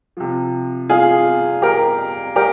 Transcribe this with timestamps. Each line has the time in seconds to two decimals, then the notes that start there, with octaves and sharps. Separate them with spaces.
0.17 C3 F3
0.89 F4 G#4
1.62 G4 A#4
2.36 G4 A#4